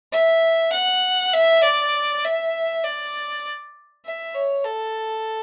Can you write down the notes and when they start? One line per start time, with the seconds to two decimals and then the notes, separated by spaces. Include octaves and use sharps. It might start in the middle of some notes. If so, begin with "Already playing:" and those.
0.13 E5
0.73 F#5
1.34 E5
1.63 D5
2.24 E5
2.84 D5
4.06 E5
4.35 C#5
4.65 A4